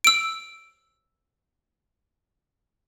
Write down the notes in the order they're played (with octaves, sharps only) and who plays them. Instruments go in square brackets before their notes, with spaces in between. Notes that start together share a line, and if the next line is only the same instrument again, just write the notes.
[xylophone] E6 D7